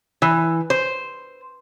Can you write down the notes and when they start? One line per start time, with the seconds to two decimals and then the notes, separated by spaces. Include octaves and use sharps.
0.22 E3
0.70 C5